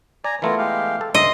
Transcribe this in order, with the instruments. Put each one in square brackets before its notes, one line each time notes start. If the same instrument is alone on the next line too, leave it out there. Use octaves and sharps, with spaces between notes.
[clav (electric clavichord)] D5 [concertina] G#5 A#5
[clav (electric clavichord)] E3 A3 B3 [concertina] E4 F4 A#4
[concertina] G#3 G4 F5
[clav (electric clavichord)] A4
[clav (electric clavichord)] C#2 G2 E5 [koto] D#5 [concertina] C6